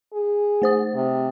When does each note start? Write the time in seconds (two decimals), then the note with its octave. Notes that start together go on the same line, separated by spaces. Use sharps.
0.14 G#4
0.62 A3 C5 D#6
0.95 C3